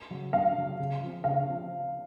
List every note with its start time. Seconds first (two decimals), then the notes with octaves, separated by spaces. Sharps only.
0.11 C#3 F#3
0.33 F#2 F5
0.57 C#3 F#3
0.80 C#3
1.02 F3 C4
1.24 C#3 F5
1.48 F3 C4